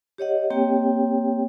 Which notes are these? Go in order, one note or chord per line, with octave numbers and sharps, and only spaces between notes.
G4 C#5 D#5 F#5
A#3 C4 G4 C#5 G5